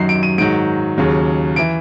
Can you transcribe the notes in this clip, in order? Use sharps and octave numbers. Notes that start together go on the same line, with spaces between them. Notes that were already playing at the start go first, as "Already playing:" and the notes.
Already playing: F#2 D#3 F#3 C7
D7
D#7
G#2 D#3 F#3 D7
D#2 C#3 F#3
E3 D7